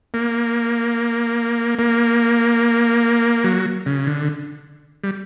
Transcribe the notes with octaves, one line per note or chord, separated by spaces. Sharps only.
A#3
A#3
F#3
C#3
D3
G3